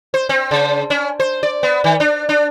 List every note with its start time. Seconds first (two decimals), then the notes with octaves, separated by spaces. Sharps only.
0.14 C5
0.29 C4
0.51 C#3
0.90 C#4
1.20 C5
1.43 D5
1.63 B3
1.84 D#3
2.00 D4
2.29 D4